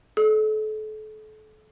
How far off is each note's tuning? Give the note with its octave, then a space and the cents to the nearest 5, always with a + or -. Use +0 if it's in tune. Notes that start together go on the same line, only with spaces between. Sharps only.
A4 -35 D5 +30